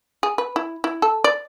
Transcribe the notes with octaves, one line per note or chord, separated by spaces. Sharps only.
G#4
B4
E4
E4
A4
D5